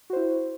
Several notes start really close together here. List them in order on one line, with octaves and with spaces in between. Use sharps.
F#4 C5 E4